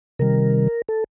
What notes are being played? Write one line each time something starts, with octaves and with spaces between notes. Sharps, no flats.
C3 D#3 G3 A#4
A4